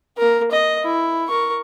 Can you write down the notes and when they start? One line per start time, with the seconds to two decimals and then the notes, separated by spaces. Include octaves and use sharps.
0.18 A#3 A#4
0.52 D#5
0.83 E4
1.28 A#4 C#6